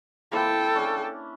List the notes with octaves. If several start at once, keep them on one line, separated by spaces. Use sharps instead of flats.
A#3 C4 E4 A4 G5
C#4 D4